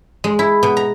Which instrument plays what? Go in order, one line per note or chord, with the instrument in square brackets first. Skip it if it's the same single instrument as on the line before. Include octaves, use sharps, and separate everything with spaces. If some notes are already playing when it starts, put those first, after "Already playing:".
[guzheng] G#3
E4
B2
A#5